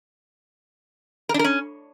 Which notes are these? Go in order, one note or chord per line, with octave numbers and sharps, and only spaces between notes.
A#4
D4
A#4
C#4